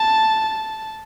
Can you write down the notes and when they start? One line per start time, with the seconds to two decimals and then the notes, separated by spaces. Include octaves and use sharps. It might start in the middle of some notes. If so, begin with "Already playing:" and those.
Already playing: A5